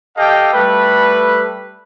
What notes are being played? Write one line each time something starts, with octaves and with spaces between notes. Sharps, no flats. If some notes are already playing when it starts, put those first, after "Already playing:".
G4 A4 D#5 F5 G5
G3 A3 A4 B4